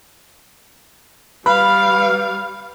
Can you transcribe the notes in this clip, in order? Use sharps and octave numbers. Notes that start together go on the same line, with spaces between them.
G3 B4 F5 B5